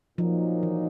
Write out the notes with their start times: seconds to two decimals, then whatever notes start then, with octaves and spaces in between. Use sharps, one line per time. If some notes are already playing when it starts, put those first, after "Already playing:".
0.18 A#2 F3 F#3 A#3 D#4
0.63 E3